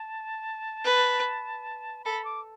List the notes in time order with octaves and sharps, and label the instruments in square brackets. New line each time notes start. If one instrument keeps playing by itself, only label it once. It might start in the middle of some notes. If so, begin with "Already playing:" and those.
Already playing: [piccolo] A5
[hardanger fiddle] B4
[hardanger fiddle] A4 [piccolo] B5
[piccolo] D6